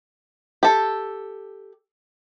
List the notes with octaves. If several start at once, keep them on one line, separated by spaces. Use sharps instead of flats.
G4 A4